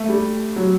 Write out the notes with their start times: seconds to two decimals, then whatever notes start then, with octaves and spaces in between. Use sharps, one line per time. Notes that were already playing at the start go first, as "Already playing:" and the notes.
Already playing: A3
0.09 G3
0.56 F#3